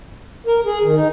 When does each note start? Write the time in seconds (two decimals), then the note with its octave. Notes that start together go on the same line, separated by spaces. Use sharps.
0.46 A#4
0.66 G#4
0.83 D#3
0.95 D#4